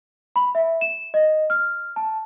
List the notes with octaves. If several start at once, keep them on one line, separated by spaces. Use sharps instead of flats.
B5
E5
E7
D#5
F6
A5